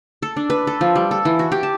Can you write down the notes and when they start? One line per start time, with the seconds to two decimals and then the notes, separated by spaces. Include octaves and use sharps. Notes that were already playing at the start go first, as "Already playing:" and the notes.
0.22 A4
0.37 D4
0.50 B4
0.67 A4
0.81 F3
0.96 G3
1.11 A4
1.25 E3
1.39 F#4
1.52 G4
1.63 A5